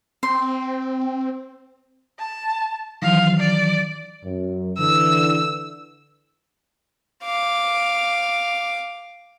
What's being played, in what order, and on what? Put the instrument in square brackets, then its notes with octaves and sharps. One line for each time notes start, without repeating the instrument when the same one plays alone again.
[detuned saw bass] C4 [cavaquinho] C6
[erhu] A5
[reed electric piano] D#3 E3 F#3 [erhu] F5
[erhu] D5
[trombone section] F#2
[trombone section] D3 E3 [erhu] E6
[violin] F5 D6